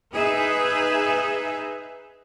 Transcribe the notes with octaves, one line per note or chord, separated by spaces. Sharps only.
D#4 G#4 B4 E5